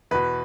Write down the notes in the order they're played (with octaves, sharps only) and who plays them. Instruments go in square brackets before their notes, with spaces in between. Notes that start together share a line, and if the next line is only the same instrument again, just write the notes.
[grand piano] E2 B2 B4